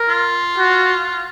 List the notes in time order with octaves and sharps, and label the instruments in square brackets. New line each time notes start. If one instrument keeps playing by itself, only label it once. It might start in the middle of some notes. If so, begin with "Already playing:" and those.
Already playing: [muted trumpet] A#4
[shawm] F4
[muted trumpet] F#4